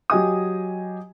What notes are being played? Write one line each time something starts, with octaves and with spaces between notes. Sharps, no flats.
F#3 G4 D#5 G#5 D#6